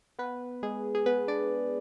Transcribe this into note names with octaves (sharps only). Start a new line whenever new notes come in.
B3 B4
G#3 G#4
G#4
B3 B4
D4 D5